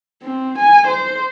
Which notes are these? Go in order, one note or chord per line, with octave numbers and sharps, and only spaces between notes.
C4
G#5
C5